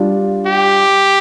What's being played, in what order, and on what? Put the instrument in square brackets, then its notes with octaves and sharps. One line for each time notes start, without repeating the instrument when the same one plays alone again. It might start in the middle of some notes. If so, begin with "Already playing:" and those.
Already playing: [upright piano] G3 D4 F4
[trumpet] G4